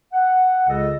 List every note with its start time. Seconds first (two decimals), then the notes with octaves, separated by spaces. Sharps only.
0.11 F#5
0.68 C#2 C#3 A4 D#5